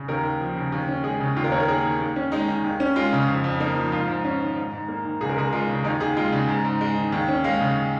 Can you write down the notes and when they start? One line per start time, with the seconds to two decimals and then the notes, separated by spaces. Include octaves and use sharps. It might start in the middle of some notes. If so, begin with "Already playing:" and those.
Already playing: C#3
0.08 D#2 A#4
0.24 D#2
0.40 F3
0.56 C#3
0.72 D#2
0.89 C#4
1.03 G#3 G#4
1.20 C#3
1.36 D#2 F4
1.44 A#4
1.52 D#2 C#5
1.60 A#4
1.68 A#3 G#4
1.84 D#3
2.01 D#2
2.16 C#4
2.32 G#3 D#4
2.48 D#3
2.64 D#2
2.80 C#4
2.96 G#3 F4
3.13 C#3
3.28 F2
3.44 F2
3.60 A#3 D#4
3.76 F3
3.92 G#2 F4
4.08 G#2
4.25 C#4
4.40 D#3
4.56 G#2
4.73 G#2
4.88 A#3
5.04 D#3
5.21 C#2 G#4
5.29 A#4
5.36 C#2 G#4
5.53 G#3 F4
5.69 C#3
5.84 D#2 D#4
6.00 D#2 G#4
6.17 G#3 F4
6.32 C#3
6.48 G#2
6.65 G#2
6.81 G#3
6.96 D#3
7.12 D#2
7.29 C#4
7.44 G#3 F5
7.61 C#3